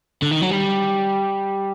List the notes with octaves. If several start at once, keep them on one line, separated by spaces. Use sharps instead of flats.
D3
D#3
F#3
G3